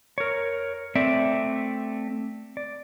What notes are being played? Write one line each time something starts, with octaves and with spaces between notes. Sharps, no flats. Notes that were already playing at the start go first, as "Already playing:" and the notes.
A#4 C#5
A3 C4 D5 E5
D5